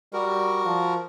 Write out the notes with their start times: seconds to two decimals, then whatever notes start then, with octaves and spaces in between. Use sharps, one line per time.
0.13 G3 F#4 A#4
0.65 F3